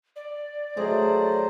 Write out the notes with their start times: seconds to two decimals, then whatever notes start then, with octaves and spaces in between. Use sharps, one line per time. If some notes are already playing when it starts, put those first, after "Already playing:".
0.16 D5
0.77 F#3 A3 G#4 C5 D#5